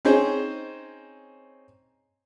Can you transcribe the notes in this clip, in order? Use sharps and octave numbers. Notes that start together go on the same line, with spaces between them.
C4 C#4 D#4 G#4 C5